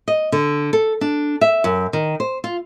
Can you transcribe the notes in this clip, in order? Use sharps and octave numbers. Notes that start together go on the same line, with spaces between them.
D#5
D3
A4
D4
E5
F#2
D#3
C5
F4